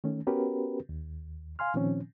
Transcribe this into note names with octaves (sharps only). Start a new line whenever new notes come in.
D#3 A3 C#4
B3 C#4 F#4 G4 A#4 B4
D#2
F5 G#5 C6 F6
A#2 D#3 F3 C4 C#4